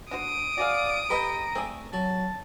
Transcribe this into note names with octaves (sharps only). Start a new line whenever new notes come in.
D4 F#4 C5 D#6 D7
F#4 G#4 D5 F5
G4 A4 B4 D#5 G5 A#5
A3 C4 G#4 D5
F#3 A5